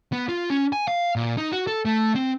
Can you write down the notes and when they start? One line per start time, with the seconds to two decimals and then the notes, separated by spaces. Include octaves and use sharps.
0.13 B3
0.29 F4
0.50 C#4
0.73 G#5
0.88 F5
1.16 A#2
1.38 D#4
1.52 F#4
1.67 A4
1.85 A3
2.15 C4